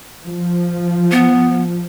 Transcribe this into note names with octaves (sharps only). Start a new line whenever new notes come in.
F3
B3